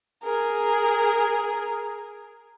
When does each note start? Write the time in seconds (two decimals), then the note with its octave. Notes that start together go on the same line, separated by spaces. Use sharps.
0.24 G#4 A#4